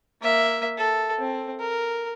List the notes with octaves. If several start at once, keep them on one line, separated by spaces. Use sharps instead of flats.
A#3 E5
A4
C4
A#4